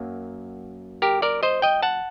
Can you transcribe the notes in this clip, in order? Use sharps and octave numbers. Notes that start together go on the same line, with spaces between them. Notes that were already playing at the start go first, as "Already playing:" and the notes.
Already playing: F#2 F#3 A#3
G4 A#4
A#4 D5
C5 D#5
D#5 G5
F#5 A5